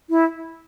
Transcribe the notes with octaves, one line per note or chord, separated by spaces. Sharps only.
E4